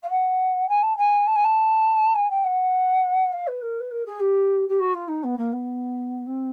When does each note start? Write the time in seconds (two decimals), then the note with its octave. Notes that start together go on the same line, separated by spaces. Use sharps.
0.03 F5
0.09 F#5
0.68 G#5
0.82 A5
0.97 G#5
1.27 A5
1.35 G#5
1.44 A5
2.14 G#5
2.30 G5
2.44 F#5
3.32 F5
3.47 B4
3.61 A#4
3.80 B4
3.91 A#4
4.05 G#4
4.20 G4
4.68 G4
4.79 F#4
4.94 F4
5.08 D#4
5.23 B3
5.37 A#3
5.52 B3
6.26 C4